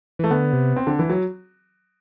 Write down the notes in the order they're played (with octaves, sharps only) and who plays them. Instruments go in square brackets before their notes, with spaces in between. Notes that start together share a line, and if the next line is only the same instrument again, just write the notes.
[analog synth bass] E3 [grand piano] A3
[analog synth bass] D3 [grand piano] B3
[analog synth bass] C3
[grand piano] C4
D3
E3
F#3